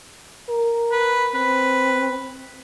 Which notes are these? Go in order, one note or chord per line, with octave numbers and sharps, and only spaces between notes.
A#4
B4
C4 B4